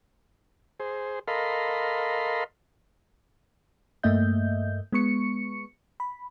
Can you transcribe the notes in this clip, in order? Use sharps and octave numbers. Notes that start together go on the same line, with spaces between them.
G#4 C5
A4 A#4 D#5 F5 B5 C6
G2 A3 A#3 D#5 E5 G6
G#3 B3 C#6 C#7
B5